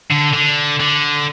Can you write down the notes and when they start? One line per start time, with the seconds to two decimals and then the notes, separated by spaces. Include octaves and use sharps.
0.11 D3
0.34 D3
0.80 D3